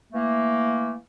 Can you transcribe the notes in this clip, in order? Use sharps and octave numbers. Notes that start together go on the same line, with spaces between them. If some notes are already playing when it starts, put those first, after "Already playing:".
E3 A3 A#3